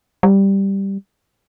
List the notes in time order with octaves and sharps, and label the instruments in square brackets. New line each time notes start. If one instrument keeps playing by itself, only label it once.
[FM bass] G3